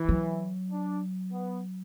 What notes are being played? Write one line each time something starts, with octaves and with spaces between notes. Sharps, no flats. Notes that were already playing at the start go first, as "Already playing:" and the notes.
Already playing: E3
F#3
D4
B3